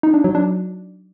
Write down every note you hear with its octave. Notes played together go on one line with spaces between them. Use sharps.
D#4
D4
F#3
D4